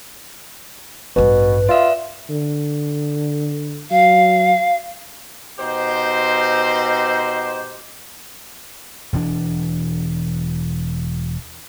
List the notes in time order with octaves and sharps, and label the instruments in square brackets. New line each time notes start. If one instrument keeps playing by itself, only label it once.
[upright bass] A1 G2 [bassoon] B2 [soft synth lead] B4
[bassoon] F4 [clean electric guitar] D5 E5
[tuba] D3
[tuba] F#3 [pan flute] F5
[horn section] B2 D#4 G4 C5
[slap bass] E1 E3 C4 D4